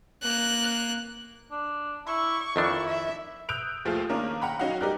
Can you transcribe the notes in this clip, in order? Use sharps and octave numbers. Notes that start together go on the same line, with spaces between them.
A#3 F#6
D4
E4 C#6
F2 D#3 D4 E4
E5
D#6 E6 F#6 G6 D7 F7
D#2 F3 A3 F4 G#4 F5
D#3 A#3 C#4 D4 A#4
F#5 G5 A#5 B5 F#6
F#3 C#4 D#4 F#4 F5 F#5
G3 D#4 G4 A#4 D5 F#6